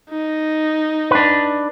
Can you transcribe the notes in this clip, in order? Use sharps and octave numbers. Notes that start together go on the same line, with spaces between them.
D#4
D4 B4